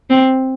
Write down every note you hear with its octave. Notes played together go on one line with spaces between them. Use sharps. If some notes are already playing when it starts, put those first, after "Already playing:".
C4